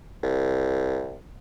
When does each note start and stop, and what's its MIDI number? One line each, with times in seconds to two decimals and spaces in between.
0.23 1.19 36